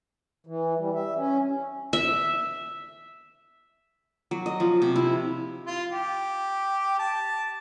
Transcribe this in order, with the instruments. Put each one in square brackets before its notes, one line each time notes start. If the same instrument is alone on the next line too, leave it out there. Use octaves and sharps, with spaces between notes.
[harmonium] E3
G3
E5
C#4
[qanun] E5
F#3
D#5
F3
C3
E4
[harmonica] F4
G4
A5